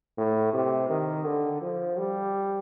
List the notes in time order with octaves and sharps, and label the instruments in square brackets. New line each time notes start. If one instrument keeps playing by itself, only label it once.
[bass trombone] A2
C3
D#3
D3
F3
G3